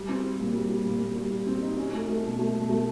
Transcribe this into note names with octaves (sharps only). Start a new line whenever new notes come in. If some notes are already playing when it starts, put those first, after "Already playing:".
Already playing: G3
C4
G3
A#2
G3
G3
A#2
A#2
G3
G3
C4
D#4
C#4
A3
A3
B2
A3
B2
A3